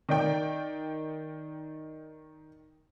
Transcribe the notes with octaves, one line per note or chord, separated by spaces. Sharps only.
D#3 D5 G5